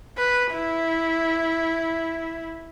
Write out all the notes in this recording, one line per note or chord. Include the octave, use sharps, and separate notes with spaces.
B4
E4